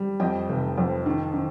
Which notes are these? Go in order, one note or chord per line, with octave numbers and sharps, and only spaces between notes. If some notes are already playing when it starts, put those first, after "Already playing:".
Already playing: G3
F2 D#5 G5
F1
F2
D#3
D#3